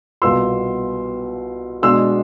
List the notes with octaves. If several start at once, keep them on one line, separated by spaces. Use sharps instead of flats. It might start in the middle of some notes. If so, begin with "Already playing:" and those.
C2 B2 B3 F4 C6 E6
B2 G#3 D4 C6 E6